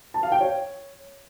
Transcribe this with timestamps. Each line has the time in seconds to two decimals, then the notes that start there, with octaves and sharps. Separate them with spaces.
0.14 A5
0.23 F5
0.32 G5
0.41 C#5